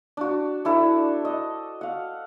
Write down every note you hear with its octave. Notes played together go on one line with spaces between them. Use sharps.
D4 F#4
D4 E4 A4 C5
D#5
F5 F#5